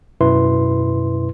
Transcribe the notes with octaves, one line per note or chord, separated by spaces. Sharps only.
F#2 B2 E4 B4 C6